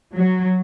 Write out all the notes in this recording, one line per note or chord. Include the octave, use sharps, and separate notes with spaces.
F#3